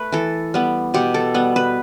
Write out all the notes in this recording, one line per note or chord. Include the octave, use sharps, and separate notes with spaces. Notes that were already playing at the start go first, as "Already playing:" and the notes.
Already playing: A3 B4
E3 A4
G3 B3
B2 G4
A4
G3 B3
B4